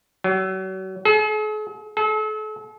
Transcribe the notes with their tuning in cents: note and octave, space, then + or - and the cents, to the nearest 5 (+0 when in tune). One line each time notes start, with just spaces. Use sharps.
F#3 +35
G#4 +45
A4 -40